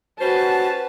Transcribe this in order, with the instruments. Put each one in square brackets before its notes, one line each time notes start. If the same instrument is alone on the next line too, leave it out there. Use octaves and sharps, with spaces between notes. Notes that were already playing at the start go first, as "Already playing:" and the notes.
[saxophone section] G3 C#4 C5 [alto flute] F#4 [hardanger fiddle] B4 [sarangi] A5